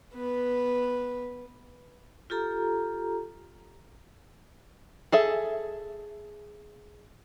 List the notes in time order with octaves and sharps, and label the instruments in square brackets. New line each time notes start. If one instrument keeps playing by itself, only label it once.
[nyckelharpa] B3 B4
[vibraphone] F4 G4 A4 A#5
[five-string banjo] G#4 A4 E5